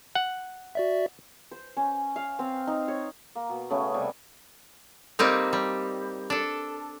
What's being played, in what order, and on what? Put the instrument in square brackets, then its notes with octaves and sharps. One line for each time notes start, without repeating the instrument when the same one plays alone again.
[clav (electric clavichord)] F#5
[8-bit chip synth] F#4 D5 E5
[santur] C5
C#4
F5
C4
D#4
C#5
[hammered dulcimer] A#3
B2
C#3 A3 B3 C#4
C3 G3 G#5
[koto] G3 A#3 C4 D#4
G3
D4 A4